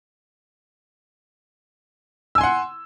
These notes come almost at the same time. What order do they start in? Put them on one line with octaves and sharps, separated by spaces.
E6 G#5 C6 F#5